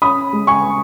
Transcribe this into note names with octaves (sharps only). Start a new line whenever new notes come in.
C#4 B5 D#6
G#3
G#5 C#6